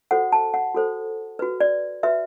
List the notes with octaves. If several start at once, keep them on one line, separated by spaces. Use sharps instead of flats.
F#4 A4 C5 F#5
A5
F#5
F#4 A4 C5
F#4 B4
D5
F#4 B4 E5